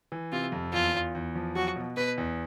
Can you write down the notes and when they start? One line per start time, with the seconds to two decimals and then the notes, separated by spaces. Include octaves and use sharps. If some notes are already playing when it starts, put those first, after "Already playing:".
0.12 E3
0.32 C3 F4
0.52 F2
0.73 E2 F4
0.94 E2
1.15 E2
1.35 F3
1.55 F#3 F#4
1.76 B2
1.96 B2 B4
2.18 E2